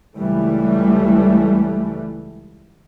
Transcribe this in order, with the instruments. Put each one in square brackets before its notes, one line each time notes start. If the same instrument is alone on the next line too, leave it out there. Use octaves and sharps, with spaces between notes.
[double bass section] C#2 E3 G3 A3